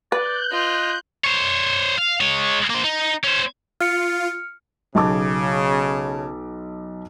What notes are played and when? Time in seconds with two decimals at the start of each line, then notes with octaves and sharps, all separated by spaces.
0.12 B4 D5 F#6 G6
0.51 F4 D#5
1.24 C5 C#5
1.98 F5
2.21 G#3 C#5
2.70 A#3 C5
2.84 D#4
3.24 C#4 C5
3.80 F4 F6 C#7
4.95 B1 C#3 A5 D6